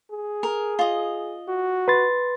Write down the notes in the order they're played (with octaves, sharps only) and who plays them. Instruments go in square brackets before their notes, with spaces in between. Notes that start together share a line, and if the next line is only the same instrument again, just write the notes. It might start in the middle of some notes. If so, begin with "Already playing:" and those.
[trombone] G#4
[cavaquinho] A#4
F4 D#5
[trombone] F#4
[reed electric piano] B4 C6 A6